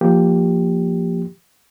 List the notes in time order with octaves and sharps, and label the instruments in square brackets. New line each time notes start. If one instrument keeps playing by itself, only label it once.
[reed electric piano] F3 A#3 G4